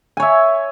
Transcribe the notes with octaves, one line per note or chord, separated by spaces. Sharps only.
C#5 E5 G#5